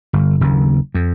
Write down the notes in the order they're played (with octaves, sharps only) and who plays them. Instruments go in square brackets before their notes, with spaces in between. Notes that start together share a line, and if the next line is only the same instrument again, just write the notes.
[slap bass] G1
F#1 D#2
F2